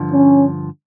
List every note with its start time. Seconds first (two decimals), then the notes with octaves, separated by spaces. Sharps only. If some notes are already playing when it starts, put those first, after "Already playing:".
Already playing: G2 D3 F3
0.11 C#4